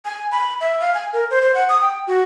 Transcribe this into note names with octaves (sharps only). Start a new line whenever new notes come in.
G#5
B5
E5
F5
G#5
A#4
C5
C5
F#5
D#6
G5
F#4